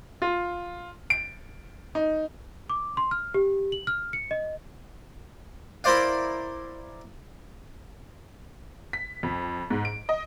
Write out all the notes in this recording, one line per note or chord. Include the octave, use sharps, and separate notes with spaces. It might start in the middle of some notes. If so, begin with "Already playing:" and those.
F4
D7
D#4
D6
C6
F6
G4
F#7
F6
C#7
D#5
E4 A#4 C5 D5 F5
B6
F2
G#2
D7
D#5